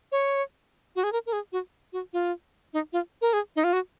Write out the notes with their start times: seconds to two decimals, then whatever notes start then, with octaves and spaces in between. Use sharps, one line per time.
0.12 C#5
0.96 F#4
1.04 G#4
1.13 A#4
1.26 A#4
1.33 G#4
1.52 F#4
1.93 F#4
2.13 F4
2.73 D#4
2.93 F4
3.22 A#4
3.33 G#4
3.56 D#4
3.64 F4
3.73 F#4